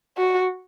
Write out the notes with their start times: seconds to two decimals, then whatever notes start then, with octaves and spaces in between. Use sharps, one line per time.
0.18 F#4